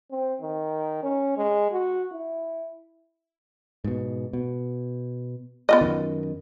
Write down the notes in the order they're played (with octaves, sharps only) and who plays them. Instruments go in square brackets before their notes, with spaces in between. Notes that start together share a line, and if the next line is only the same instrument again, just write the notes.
[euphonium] C4
D#3
C#4
G#3
F#4
E4
[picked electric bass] G#2 B2
B2
[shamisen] B3 F4 D#5
[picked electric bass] F#2 D#3